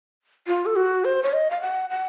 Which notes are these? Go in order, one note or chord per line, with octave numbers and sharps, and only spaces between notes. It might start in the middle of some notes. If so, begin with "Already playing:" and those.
F4
A4
F#4
C5
C#5
D#5
F5
F#5
F#5